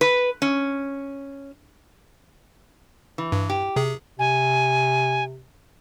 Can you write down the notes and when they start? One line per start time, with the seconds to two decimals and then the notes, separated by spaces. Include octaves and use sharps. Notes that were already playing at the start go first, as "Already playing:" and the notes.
0.01 B4
0.42 C#4
3.18 E3
3.32 G2
3.50 G4
3.76 C3 G#4
4.19 C3 G#5